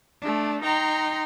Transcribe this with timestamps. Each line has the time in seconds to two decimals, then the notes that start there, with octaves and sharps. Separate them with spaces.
0.21 A3 D4
0.62 D#4 G5 A#5 C6